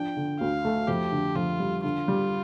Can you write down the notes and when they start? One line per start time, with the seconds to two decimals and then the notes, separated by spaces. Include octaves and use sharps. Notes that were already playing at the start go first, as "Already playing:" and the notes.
Already playing: F3 D4 G5
0.17 D3
0.40 D2 F5
0.65 A3
0.88 F2 G4
1.12 D3
1.35 F2 F4
1.60 G3
1.83 D3 F4
2.08 G3